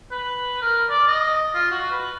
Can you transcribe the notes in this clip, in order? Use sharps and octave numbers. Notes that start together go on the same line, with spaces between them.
B4
A#4
D5
D#5
F4
F#4
B4